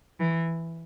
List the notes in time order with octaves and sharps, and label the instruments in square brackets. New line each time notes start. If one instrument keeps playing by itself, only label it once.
[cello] E3